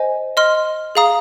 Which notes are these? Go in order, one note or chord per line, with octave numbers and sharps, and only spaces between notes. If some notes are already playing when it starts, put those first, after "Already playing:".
Already playing: C5 D#5 G#5
D#5 C6 F6
G#4 F5 A#5 D#6